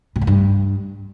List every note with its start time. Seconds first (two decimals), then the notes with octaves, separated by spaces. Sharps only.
0.16 B2
0.21 A2
0.27 G2